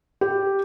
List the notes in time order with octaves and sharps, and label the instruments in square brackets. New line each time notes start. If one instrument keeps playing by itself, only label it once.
[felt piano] G4